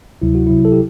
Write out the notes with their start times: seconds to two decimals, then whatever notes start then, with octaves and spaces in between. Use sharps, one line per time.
0.22 D2 C3 F#3 E4
0.35 F#4
0.47 C2 C3 F#3 E4
0.65 A4
0.72 G4